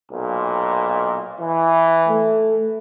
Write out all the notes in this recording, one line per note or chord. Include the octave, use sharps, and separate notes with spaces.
B1 A#2
E3
A3